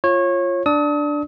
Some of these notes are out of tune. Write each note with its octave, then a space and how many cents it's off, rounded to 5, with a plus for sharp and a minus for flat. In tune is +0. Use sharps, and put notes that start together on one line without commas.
F4 -10 C#5 -25
D4 +0 D5 +0 D#6 +40